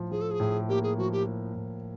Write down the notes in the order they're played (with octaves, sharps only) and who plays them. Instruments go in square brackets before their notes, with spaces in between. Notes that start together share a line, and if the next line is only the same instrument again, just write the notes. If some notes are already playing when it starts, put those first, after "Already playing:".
Already playing: [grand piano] A2 F3
[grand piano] F3 [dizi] G#4
[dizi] A4
G#4
[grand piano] A2
[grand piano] A#3 [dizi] G4
[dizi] G#4
[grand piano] F3 [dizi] F#4
[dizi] G4
[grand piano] F3
A2